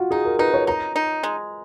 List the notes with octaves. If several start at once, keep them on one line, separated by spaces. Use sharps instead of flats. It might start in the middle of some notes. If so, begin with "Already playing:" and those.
Already playing: F4 F#4
D#4 G#4
A#4
D#4 B4
C#5
D#4 A#5
D#4
G#3